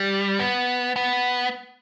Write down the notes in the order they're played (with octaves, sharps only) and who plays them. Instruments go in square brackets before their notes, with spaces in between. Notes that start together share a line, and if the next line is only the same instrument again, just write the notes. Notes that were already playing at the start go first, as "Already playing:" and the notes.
Already playing: [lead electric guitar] G3
B3
B3